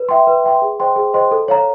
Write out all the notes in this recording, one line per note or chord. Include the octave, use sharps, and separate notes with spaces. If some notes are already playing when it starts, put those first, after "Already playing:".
Already playing: B4
E5 G5 C6
B4
E5 G5 C6
G#4
C5 D#5 G5 C6
G#4
C5 D#5 G5 C6
A4
C#5 F5 A#5